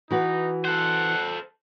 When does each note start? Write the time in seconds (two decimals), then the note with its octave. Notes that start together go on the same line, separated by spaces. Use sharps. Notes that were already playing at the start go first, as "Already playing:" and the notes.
0.11 E3 D#4 F#4 B4
0.65 A4 C5 F#5